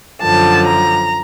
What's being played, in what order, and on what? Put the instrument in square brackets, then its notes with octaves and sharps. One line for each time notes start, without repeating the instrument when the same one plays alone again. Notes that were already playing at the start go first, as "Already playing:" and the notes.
[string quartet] F#2 D3 F3 A5
A#5